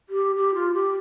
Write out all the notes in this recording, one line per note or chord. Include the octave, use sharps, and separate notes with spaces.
G4
G4
F4
G4